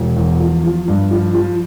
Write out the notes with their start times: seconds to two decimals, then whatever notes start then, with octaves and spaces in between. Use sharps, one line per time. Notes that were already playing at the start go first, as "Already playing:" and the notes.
Already playing: E1
0.17 E2
0.40 F3
0.64 F3
0.88 G2
1.11 F3
1.35 F3